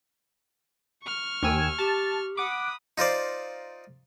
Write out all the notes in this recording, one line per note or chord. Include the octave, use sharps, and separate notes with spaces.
C#6 F6
D#2 G5 G#5 E6
G4 A5
F#5 B5 D6 D#6
D#4 F4 C5 D5